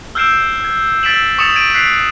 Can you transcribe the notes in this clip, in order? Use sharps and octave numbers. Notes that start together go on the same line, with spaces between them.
E6 F6 G6 C7 D7 E7
G#6
E6 A6 B6 D7 E7 F#7
C#6 D#6 A6 C#7 E7 F7
G#6 A6 D7 D#7
F#6 B6 C7 D7 F7